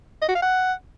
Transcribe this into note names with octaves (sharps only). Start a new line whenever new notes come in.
D#5
F#4
F5
F#5